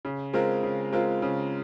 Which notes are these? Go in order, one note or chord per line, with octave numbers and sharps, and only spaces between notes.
C#3
G#3 C4 F4 A#4
C#3
G#3 C4 F4 A#4
C#3